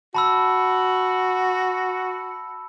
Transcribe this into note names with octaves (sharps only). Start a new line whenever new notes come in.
F#4 A5 B5 E6